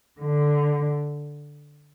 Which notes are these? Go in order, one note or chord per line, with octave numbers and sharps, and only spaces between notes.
D3